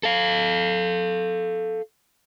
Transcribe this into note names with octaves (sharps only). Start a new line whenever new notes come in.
A4 F5